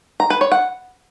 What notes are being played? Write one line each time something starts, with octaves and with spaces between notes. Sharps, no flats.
A#5
B4
C#5
F#5